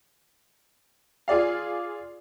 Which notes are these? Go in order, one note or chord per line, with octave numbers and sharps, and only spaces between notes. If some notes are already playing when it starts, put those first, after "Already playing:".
F4 G#4 D5 F5